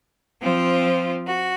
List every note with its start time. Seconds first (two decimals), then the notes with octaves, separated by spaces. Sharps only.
0.42 F3 C4 F4
1.27 F#4